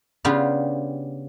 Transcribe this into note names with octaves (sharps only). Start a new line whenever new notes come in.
C#3 B3 D4 F4 G4